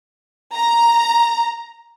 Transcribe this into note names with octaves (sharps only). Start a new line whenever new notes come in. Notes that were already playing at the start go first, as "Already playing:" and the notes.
A#5